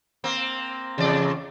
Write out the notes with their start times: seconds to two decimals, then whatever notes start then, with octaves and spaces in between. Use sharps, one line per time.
0.24 A#3 C4
0.98 E2 C#3 D5